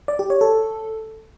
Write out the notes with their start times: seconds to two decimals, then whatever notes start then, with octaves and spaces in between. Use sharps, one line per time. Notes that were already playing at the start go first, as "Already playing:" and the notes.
0.08 D5
0.19 G4
0.30 C#5
0.41 A4